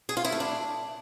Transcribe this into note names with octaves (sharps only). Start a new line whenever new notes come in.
G#4
F4
E4
A3
D4